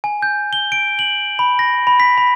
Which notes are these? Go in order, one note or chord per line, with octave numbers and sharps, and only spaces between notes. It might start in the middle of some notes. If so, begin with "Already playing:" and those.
G#5
G6
G7
D7
F#7
B5
A#6
B5
B6
B5